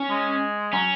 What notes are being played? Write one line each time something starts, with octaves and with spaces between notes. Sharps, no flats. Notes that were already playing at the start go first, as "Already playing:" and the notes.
Already playing: C#4
G#3
F#3 C#4